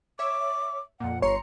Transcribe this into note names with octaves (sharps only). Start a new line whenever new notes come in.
C#5 E5 D6
F2 A#2 F#5
G1 C#5 A#5 C6 C#7